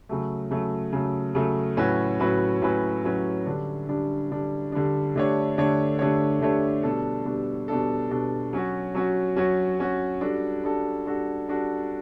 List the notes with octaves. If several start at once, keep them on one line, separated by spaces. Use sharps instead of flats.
C#3 F#3 A3
C#3 F#3 A3
C#3 F#3 A3
C#3 F#3 A3
A2 F#3 C#4 F#4 B4
A2 F#3 C#4 F#4 B4
A2 F#3 C#4 F#4 B4
A2 F#3 C#4 F#4 B4
D3 G3 D4
D3 G3 D4
D3 G3 D4
D3 G3 D4
D3 A3 D4 G4 C#5
D3 A3 D4 G4 C#5
D3 A3 D4 G4 C#5
D3 A3 D4 G4 C#5
B2 G3 D4 A4
B2 G3 D4 A4
B2 G3 D4 A4
B2 G3 D4 A4
F#3 C#4 F#4
F#3 C#4 F#4
F#3 C#4 F#4
F#3 C#4 F#4
G3 D4 F#4 A4
G3 D4 F#4 A4
G3 D4 F#4 A4
G3 D4 F#4 A4